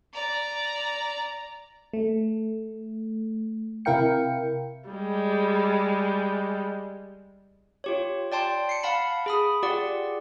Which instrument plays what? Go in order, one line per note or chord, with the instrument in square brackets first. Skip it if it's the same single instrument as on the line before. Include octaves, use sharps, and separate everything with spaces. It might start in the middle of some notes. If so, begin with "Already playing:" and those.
[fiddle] D5 A#5
[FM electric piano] A3
C3 E4 A#4 F5 G5 C#7
[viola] G3 G#3
[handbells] F4 G4 C#5
D5 G5 A5 C6
C7 C#7
F5 F#5 A5 B5
G#4 B5 D#6
F4 G4 G#4 D5 F#5